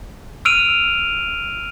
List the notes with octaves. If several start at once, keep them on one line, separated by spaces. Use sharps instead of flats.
E6 F6 D7 D#7 F7